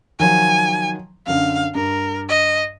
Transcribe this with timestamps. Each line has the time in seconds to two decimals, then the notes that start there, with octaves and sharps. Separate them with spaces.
0.20 D#3 F3 F#3 G#5
1.27 F#2 D3 F5
1.75 G2 A#4
2.29 D#5